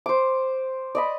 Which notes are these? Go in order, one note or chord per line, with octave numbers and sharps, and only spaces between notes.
C5 D6
D5 D#5 B5